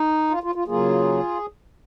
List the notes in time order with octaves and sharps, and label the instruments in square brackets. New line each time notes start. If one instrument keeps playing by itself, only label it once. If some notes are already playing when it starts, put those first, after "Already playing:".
Already playing: [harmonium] D#4
F4
F4
F4
C#3 F#3 A#3 F4 G#4